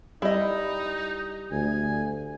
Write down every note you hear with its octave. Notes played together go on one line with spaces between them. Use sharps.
G3 D#4 E4 D#5
D2 G#5